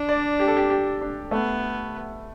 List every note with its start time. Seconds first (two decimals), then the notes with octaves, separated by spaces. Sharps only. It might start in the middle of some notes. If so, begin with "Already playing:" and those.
Already playing: D4
0.09 D5
0.40 G4
0.48 A4
0.57 G4
0.70 G4
1.01 D4
1.31 A3 B3